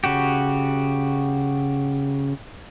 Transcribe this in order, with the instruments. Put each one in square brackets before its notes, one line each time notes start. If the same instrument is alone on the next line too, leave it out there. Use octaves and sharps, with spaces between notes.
[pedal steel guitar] C#3 F#4 G4